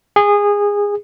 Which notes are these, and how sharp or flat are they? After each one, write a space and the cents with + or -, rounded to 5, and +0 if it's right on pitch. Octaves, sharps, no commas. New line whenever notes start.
G#4 -20